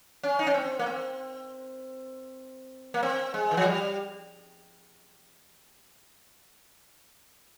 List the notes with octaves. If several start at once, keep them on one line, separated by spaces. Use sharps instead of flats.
C#4
D#4
C#4
C4
A#3
C4
A#3
C4
G#3
D#3
F3
G3